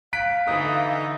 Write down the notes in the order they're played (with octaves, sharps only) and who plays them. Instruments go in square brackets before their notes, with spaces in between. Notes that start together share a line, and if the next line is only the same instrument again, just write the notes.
[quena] F5 [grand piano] F#6 B6 D7
[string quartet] D3 E3 [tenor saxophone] D#4 [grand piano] D#6